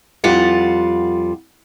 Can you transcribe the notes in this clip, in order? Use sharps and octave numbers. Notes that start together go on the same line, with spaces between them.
F2 G3 F4 F#5